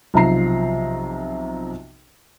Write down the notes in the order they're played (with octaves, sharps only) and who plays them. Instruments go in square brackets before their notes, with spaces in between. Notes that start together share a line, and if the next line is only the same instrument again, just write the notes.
[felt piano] B1 C3 F3 A#5 C7